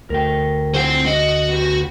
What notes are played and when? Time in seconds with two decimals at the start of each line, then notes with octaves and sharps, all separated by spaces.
0.10 D2 A#4 G5
0.74 E3 F3 C5 F#5 G5
1.06 F#4 D#5
1.49 B3 G4